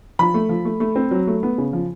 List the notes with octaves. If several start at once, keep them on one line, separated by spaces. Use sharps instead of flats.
F3 B5
A3
F3
A3
A3
C4
F#3
A3
B3
C#3
F3